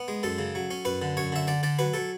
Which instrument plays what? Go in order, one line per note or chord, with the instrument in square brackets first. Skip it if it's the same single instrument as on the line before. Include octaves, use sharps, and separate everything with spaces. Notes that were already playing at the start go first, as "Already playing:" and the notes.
Already playing: [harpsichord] B3
G#3
F#2 A4
C#3
F#3
C#4
F#2 B4
D3
F#2 C#5
D3 E5
D3 D5
D3 D5
F#3 B4
F#3 A4